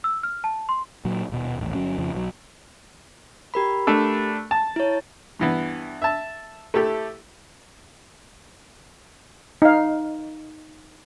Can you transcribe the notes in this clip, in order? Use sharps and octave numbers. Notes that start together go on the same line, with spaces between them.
E6
F6
A5
C6
A#2 F#3
D#1 B2
D#1 A1
G1 F#3 C#4
F2 C#3 F3
B1 F#3
G4 A#4 B5
A3 D4 A4
A5
E4 C#5
G2 E3 B3
E5 A5
A3 E4 G4 A4
D#4 F5